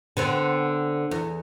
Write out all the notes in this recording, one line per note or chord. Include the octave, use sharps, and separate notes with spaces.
D3 B3 C4
E2